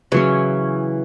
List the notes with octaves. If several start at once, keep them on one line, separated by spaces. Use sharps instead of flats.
C#3 E3 F#3 C#4